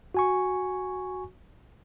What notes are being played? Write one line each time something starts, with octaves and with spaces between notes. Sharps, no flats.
F#4 G#5 C#6